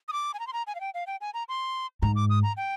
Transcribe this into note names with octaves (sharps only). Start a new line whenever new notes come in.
D#6
D6
G#5
A#5
C6
A#5
G#5
F5
G5
F5
G5
G#5
A#5
C6
G#2 A#5
D6
D#6
A#5
G5